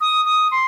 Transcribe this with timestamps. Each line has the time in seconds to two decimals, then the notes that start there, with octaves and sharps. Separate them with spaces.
0.01 D#6
0.25 D#6
0.51 C6